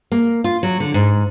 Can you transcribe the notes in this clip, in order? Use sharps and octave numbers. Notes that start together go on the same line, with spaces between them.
A#3
F4
F#3
D3
G#2